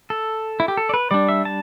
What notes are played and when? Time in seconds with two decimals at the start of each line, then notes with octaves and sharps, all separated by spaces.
0.10 A4
0.60 E4
0.68 G4
0.77 A4
0.89 D5
0.94 B4
1.11 G3 D4 D5
1.29 E5
1.45 A5